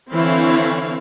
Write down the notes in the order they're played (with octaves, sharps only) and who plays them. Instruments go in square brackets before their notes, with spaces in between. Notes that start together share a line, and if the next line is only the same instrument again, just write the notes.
[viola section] D3 E3 C4 E4 C#5 F5